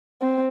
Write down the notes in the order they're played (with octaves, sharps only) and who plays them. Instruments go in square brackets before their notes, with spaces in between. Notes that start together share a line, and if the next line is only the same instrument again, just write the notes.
[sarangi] C4